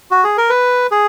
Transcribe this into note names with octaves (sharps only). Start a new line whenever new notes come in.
F#4
G#4
A#4
B4
G#4